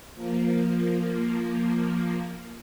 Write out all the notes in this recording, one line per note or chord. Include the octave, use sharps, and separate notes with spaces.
F3 A#3